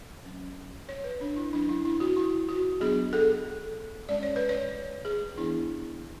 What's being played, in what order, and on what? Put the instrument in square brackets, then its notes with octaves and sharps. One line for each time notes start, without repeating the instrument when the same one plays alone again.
[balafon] F#3 C#4
C#5
B4
D4
E4
F#3 C#4 D4
E4
E4
F#4
E4
F#4
F#3 B3 D4 G#4
A4
G#3 C#4 D5
C#5
B4
C#5
G#4
E3 B3 D4 E4